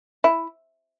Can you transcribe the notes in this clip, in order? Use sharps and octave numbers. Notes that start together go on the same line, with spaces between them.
E4